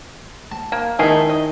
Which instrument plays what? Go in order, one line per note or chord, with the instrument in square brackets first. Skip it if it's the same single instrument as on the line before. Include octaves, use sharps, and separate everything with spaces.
[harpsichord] A5
[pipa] A#3
[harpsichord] D#3 D#4 [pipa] A3 E4 G#4
[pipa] D#5